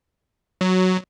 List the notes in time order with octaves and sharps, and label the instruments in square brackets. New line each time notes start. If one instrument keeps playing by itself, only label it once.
[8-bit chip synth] F#3